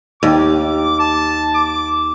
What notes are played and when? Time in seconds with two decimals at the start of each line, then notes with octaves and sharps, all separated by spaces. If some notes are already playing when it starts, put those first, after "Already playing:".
0.23 D#2 D6
1.00 A5
1.55 D6